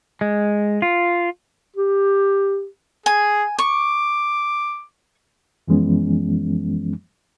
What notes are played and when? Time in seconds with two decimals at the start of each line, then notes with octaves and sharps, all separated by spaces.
0.21 G#3
0.82 F4
1.76 G4
3.06 G#4 G#5
3.58 C#6 D6
5.68 F#2 E3 F3 G#3 B3 C#4